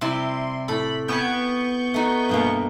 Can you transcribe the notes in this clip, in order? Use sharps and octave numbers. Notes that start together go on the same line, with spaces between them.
C3 G3 E4 C6
A2 A4 B5
B3 G5 G#5 B5 C#6 G6
A3 D#4 F#4
G2 B2 A#3